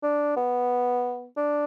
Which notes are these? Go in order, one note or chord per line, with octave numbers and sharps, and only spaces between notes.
D4
B3
D4